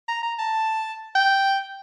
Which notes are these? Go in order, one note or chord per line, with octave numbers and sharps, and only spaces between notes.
A#5
A#5
A5
G5